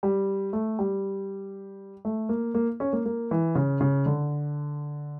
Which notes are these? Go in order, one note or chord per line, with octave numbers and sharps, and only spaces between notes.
G3
A3
G3
A3
A#3
A#3
C#4
A#3
A#3
E3
C#3
C#3
D3